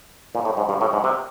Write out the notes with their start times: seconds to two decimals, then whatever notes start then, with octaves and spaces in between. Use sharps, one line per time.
0.35 A#2
0.45 A2
0.57 G#2
0.69 G2
0.81 A2
0.93 G#2
1.04 C3